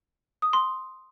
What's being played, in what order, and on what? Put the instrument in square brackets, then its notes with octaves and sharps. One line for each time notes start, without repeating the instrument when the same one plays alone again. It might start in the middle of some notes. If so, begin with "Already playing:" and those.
[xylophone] D#6
C6